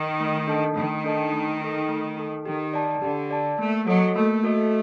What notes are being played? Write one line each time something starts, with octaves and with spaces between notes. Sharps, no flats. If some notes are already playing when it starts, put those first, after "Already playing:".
Already playing: D#3
A3
D4 A4 D#5 A5
D#3 A3
D4 A4 D#5 A5
A3
D#4 A4
A3
D#4 A4
D#3 G4
D5 A5
D3 G4
D5 A5
A3 A#3
F#3 F#4 A4 D#5
A3 A#3
F#4 A4 D#5